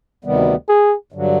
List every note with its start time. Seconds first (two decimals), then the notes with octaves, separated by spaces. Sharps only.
0.24 D2 C3 D#3 G3 B3
0.69 G#4
1.12 G2 D3 F#3